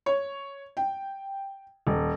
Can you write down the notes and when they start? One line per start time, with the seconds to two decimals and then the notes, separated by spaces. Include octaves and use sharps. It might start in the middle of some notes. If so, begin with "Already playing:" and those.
0.06 C#5
0.77 G5
1.87 D#1